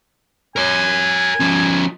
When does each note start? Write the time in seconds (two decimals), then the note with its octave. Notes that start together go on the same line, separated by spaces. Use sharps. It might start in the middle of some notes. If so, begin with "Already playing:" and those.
0.56 A#4 C#5 G#5
1.40 F3 C#4